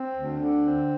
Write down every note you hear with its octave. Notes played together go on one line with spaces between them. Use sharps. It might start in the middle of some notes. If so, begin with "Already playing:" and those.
Already playing: C4
D2
D3
C4